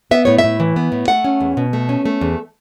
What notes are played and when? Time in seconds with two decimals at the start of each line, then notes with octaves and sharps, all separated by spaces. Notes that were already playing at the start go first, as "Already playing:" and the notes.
0.11 B3 E5
0.25 A2 C#5
0.38 E5
0.44 A2
0.60 E3
0.76 B3
0.92 A2
1.08 A3 F#5
1.24 C#4
1.41 E2
1.57 B2
1.73 A3
1.89 C#4
2.05 A3
2.21 E2